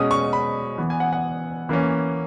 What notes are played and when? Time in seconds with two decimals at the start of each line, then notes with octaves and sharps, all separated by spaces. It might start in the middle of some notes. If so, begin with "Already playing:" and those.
Already playing: B2 G#3 C#4 D#6
0.11 C#6
0.33 B5
0.78 E3 B3
0.90 G#5
1.00 F#5
1.13 F#5
1.69 E3 A#3 C#4